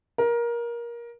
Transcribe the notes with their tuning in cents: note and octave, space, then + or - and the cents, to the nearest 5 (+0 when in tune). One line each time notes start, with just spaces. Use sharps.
A#4 +20